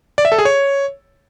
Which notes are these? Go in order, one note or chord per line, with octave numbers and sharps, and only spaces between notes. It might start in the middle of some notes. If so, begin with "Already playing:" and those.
D5
E5
A4
G#4
C#5